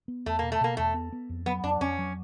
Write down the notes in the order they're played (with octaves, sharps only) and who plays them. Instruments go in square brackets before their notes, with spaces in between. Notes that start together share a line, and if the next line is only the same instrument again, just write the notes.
[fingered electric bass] B3
[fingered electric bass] E2 [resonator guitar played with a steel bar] A3
[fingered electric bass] B2 [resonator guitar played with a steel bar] A#3
[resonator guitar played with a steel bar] A3
[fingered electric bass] B2 [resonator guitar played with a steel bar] A#3
[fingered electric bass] E2 [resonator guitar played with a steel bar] A3
[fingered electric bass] B3
B3
F2
[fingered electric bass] F#3 [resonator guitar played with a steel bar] B3
[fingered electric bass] F2 [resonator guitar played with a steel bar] D4
[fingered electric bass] F2 [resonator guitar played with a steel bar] C#4
[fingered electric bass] F#3